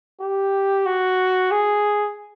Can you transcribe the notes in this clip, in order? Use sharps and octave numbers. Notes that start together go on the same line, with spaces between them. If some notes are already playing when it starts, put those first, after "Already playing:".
G4
F#4
G#4